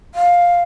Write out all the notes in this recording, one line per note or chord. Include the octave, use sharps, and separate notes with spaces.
F5